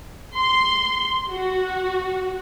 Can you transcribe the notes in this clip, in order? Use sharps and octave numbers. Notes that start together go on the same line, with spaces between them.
C6
F#4